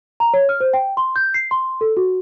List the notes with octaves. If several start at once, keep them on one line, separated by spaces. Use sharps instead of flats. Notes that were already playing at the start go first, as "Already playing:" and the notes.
A#5
C#5
F6
C5
G5
C6
G6
C7
C6
A4
F#4